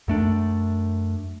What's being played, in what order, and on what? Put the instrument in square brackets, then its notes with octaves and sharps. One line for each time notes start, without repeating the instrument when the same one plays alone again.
[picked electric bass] F#2 A3 D4